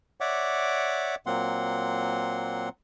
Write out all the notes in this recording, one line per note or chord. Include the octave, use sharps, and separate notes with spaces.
C#5 D5 E5 F#5 D6
A#2 F#3 A#3 C4 F#5 C6